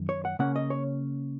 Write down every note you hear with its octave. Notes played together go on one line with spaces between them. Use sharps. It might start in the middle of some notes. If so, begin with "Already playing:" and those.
Already playing: F#2 D#3
C#5
F#5
C#3 A#3 C#4 F#5
D#5
C#5